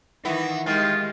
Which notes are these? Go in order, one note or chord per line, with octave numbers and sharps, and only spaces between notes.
D#3 E3 B3 E4
D#3 G#3 F4 G4